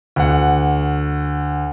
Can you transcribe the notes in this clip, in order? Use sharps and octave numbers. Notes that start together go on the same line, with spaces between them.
D2 F#5